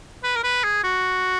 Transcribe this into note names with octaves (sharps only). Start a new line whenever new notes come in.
B4
A#4
B4
G#4
F#4